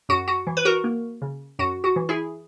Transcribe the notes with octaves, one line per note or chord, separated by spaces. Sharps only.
F#2 F#4
F#4
E3
B4
F#4 A#4
A#3
C#3
F#2 F#4
F#4
E3
E4 G#4